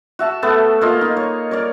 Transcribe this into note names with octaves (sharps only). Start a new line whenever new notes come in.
F#4 E5 A5
A3 B3 F#4 A4
A#3 F4 D#5
D#4
C#5
A#4 C#5 D5